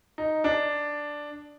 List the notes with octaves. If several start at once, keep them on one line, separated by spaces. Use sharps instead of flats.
D#4
D4